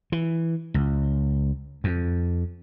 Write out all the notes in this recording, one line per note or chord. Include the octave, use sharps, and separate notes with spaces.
E3
C#2
F2